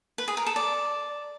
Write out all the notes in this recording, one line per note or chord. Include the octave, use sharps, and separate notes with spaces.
B4
G#4
A#4
A4
D5